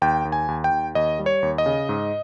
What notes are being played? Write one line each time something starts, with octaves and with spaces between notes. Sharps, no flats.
D#2 G5
D#2
G#5
D#2
G5
D#2
D#2 D#5
G3
C#5
D#2
D#5
C#3
G#2